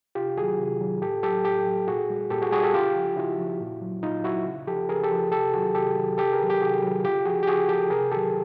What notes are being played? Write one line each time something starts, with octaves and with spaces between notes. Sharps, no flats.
C3 F4 G4
D#3 F#3 F#4 G#4
C3
D#3 F#3
A2 G4 A4
F#3 G4 A4
A2 G4 A4
F#3
A#2 F#4 G#4
G3
A#2 G4 A4
F#4 G#4
G3 F#4 G#4
G4 A4
C#3 F4 G4
F3
C#3 E4 F#4
F3
A#2
F#3
A#2 D#4 F4
F#3 E4 F#4
C#3
F3 G4 A4
C#3 G#4 A#4
G4 A4
F3
C3 G4 A4
D#3 F#3 F#4 G#4
C3 G4 A4
D#3 F#3
C3 G4 A4
G#4 A#4
D#3 F#3
G4
C3 F#4 G#4
D#3 F#3
C#3 F4 G4
F3 F#4 G#4
G4
C#3 F#4 G#4
F3 G4 A4
C3 G#4 A#4
D#3 F#3 G4 A4